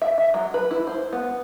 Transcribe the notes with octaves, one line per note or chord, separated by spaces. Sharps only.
E5
E5
F#3
B4
E4
C5
B3